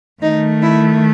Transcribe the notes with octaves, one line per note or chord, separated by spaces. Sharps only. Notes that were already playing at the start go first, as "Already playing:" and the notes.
D#3 A3 D#4
E4